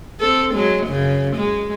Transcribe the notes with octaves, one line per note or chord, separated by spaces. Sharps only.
C4 A4
F#3 G#3
F#2 C#3
G#3